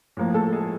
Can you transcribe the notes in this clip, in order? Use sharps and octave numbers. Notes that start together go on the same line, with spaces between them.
A2 F3 A#3
A3 A4
G#3 G#4